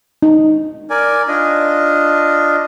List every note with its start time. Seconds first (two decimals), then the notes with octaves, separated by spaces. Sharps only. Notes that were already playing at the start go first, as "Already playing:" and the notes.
0.22 D#4
0.90 A#4 D5 G#5
1.28 D4 F4 D#5